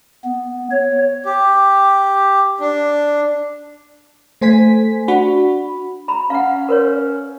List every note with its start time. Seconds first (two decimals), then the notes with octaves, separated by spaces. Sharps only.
0.25 B3
0.71 C#5
1.26 G4
2.60 D4
4.41 A3 C5 G#5 B6
5.08 D4 F#4 B5
6.08 A#5 B5
6.30 C#4 F5 F#5
6.69 A#4 B4 C#5